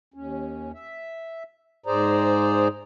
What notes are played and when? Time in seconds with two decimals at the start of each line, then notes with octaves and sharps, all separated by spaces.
0.14 D#2 C#4
0.74 E5
1.86 G#2 G#4 C5 D5 A#5